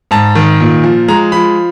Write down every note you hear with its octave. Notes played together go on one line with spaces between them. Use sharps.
G#2 A5
D#3
A#2
F3
G#3 A#5
F3 B5